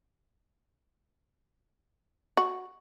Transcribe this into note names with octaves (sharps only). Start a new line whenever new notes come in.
F#4